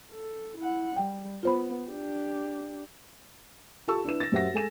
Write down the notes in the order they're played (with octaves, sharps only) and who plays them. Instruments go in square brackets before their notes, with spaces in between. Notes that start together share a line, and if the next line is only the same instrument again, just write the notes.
[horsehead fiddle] A4
E4 F#5
[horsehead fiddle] G3 [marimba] G5
[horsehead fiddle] B3 [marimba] F4 C5 B5
[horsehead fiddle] D4 G4
[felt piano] F4 G4 A4 A5 C#6 E6
D4 E4 B4 E7
A6 A#6
F#2 G4 C5 E5 F#5 A#6
G#3 A4 G#5 E7